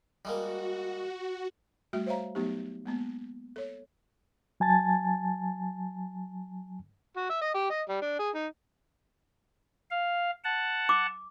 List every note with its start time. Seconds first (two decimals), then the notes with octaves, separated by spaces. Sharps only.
0.25 G3 G#3 A#3 F#4
1.93 G3 A3 F#4 E5
2.06 C5 C#5 E5 F5 A#5
2.35 F#3 A3 B3 D#4 G4
2.86 G#3 A#3 B3
3.56 A4 C#5
4.60 F#3 G#5 A5 A6
7.17 F#4
7.30 E5
7.42 D#5
7.54 G4
7.70 D#5
7.89 G3
8.01 D4
8.19 G#4
8.35 D#4
9.90 F5
10.44 F#5 A5
10.89 D6